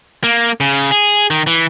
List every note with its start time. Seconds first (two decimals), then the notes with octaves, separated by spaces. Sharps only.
0.24 A#3
0.60 C#3
0.91 G#4
1.30 D#3
1.47 E3